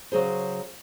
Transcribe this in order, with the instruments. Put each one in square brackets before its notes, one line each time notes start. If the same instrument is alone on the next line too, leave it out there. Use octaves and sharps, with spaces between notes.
[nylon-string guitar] C#3 F#3 G#4 C5